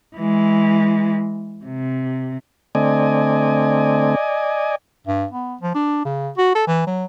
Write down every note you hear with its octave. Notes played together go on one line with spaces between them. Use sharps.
E3 G#3
C3
D3 A3 C4 D5 D#5 G#5
G2
B3
F3
D4
C#3
F#4
A4
E3
F#3